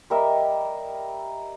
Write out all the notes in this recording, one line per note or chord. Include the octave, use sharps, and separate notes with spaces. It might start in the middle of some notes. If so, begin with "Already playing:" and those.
G3 A#4 D#5 E5